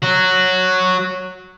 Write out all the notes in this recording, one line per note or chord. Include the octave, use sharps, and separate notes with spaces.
F#3 F#4